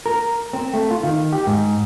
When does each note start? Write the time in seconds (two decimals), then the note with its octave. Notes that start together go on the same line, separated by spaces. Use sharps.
0.06 A#4
0.53 C4
0.74 A3
0.91 F4
1.03 D#3
1.33 G4
1.47 G#2